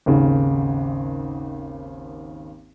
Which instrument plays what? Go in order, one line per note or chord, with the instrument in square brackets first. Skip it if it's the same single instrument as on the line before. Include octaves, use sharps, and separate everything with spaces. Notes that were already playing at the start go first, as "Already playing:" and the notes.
[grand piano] G#1 D#2 C#3